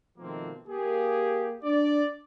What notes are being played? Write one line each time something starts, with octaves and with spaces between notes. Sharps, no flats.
B2 D#3 F3 A3 A#3 C4
A#3 G4 G#4
D4 D5